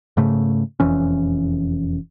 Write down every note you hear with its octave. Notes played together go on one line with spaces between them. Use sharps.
G#2 C#3 A3
E1 F2 E3 C#4